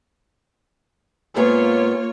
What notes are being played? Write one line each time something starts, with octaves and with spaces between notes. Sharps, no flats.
G#2 A#3 B3 F4 G#4 C#5